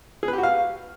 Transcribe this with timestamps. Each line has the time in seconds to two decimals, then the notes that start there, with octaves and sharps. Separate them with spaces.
0.23 G#4
0.28 B4
0.33 G4
0.38 F#4
0.43 F5